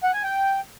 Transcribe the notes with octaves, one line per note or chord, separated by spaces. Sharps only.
F#5
G#5
G5